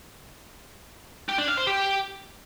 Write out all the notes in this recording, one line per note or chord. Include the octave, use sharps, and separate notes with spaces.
G4
D4
F5
C5
G4